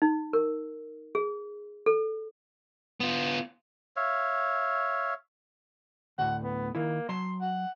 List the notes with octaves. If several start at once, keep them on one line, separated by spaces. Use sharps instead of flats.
D#4
A#4
G#4
A4
B3 F4
C#5 E5 F5
D2 A2 F#5
B3
D#3 A#3 E4
F#3 A5 A#5 C6
F#5